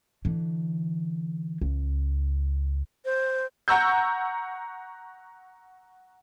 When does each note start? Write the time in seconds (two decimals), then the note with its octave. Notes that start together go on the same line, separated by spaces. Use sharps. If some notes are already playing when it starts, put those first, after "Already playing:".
0.25 D3 E3
1.61 C#2
3.05 C5
3.68 F#5 A#5 C#6 E6 G6